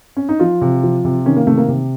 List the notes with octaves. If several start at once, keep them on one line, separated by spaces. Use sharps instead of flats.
C#4
D#4
F3 F4
C3
F3
C3
D#3 C#4
A#3
C3 A3
A#3
C3